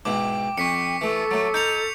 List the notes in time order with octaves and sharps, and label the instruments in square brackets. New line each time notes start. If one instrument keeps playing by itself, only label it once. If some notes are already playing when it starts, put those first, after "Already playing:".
[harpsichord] G#2 B2 E4 [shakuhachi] G5 [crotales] D6
[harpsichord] F2 [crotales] C#6 B6 C#7
[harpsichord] E3 A3 [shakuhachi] A4
[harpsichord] F#3 A3
[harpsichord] D#4 [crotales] G6 C#7 F7